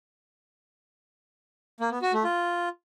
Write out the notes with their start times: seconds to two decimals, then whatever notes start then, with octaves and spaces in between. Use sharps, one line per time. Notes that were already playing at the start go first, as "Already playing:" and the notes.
1.80 A#3
1.91 B3
2.02 F#4
2.13 A3
2.24 F4